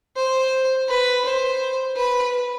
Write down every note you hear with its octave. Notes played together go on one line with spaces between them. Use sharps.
C5
B4
C5
B4